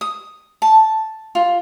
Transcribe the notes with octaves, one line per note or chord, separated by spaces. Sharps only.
D#6
A5
F4